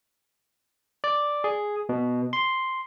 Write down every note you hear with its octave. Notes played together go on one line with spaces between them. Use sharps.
D5
G#4
B2
C6